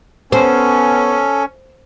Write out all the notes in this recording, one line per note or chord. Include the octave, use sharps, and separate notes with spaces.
B3 C#4 A4 C5